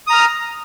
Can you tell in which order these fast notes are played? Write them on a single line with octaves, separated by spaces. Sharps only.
D#6 A#5 F6